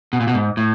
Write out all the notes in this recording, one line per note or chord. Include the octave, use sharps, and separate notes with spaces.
B2
A#2
B2
G#2
A2